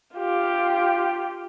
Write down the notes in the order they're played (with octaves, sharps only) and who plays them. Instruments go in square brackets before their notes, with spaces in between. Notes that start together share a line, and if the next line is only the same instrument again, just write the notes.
[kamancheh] F4 G4